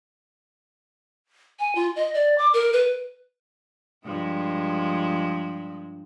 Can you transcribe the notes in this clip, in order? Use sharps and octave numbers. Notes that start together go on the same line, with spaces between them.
G#5
F4
D#5
D5
D6
A#4
B4
G2 F3 G#3